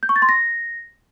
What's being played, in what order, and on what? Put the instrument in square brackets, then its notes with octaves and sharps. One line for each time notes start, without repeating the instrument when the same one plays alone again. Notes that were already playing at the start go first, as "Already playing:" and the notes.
[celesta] G6
C#6
A6
C6
A#6